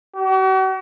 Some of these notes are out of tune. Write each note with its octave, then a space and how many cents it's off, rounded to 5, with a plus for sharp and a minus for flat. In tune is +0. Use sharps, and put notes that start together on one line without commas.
F#4 +45